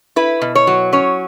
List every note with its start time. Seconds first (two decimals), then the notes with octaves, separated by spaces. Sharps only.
0.16 E4 B4
0.41 B2
0.55 C#5
0.67 F#3
0.93 C#4 C#5